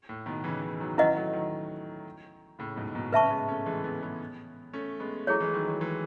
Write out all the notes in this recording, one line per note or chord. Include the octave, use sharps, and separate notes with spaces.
A2
B2 D#3
C#3 E3
C#3 E3
D#3 F#3
D#3 F#3 C#4 E4 B4 D#5 F#5
F#3 A3
D#3 F#3
A2 C#3
G#2 B2
G#2 B2
A2 C#3 B4 E5 A5 C#6
C#4
G#3 B3
A3 C#4
E3 G#3
G#3 B3
G#3 B3
A3 C#4
G#3 B3
F#3 A3 E4 G#4 C#5
E3 G#3
D#3 F#3
D#3 F#3
E3 G#3